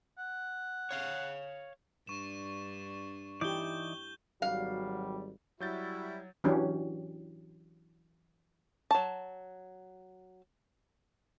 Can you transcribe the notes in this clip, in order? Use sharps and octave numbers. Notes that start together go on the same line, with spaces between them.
F#5
C#5 F5
G2 D4 C#6 E7
E3 D#4 E4 G4 D5 G6 G7
G#1 F#3 G3 F#4 F5
F#3 G3 E4 F#4 G6 A6
E3 F#3 C#4 D4 G4
F#3 A5